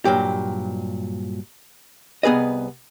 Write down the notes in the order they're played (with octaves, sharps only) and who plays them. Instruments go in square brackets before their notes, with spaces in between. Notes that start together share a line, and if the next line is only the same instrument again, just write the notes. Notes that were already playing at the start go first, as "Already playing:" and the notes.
[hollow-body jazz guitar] G2 A#2 F#3 G4
C2 B3 G#4 B4 D#5